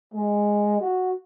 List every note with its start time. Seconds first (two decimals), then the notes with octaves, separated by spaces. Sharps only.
0.14 G#3
0.81 F#4